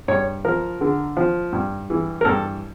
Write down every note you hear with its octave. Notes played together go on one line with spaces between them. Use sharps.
G2 C#5
F3 A#4
D3
F3
G2
E3
A#4
G2 A4